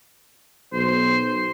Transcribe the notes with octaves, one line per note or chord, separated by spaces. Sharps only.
B1 C5